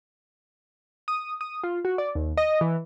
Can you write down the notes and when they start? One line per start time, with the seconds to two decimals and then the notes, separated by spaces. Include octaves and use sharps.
1.08 D#6
1.41 D#6
1.63 F4
1.85 F#4
1.98 D5
2.15 D#2
2.37 D#5
2.61 E3